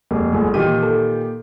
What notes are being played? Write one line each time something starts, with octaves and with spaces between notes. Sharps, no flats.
F1 G#3 A#3
G1 G#3 A3 G#4
A#2 D#3 E3 D#4 G4 D#7
A4